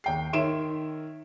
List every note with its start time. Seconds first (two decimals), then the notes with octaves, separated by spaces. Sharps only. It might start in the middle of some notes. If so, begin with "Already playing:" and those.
0.04 D#2 G5 C7
0.33 D#3 C#5 E5 C6 D7 E7